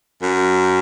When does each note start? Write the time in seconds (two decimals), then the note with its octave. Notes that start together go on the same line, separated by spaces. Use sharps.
0.22 F#2